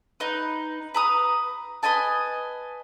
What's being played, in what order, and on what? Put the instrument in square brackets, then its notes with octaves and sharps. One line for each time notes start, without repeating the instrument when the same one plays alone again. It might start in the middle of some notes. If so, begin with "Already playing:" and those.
[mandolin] D#4 B4
B4 A#5 D#6
B4 D#5 G#5 A5